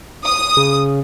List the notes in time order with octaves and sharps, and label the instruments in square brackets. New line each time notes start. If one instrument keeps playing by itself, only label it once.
[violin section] D#6
[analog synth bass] C#3